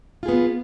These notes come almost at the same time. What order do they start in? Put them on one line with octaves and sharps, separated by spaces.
F4 G#4 B3